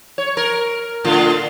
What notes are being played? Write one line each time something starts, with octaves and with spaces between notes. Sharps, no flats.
C#5
A#4
A2 D3 F4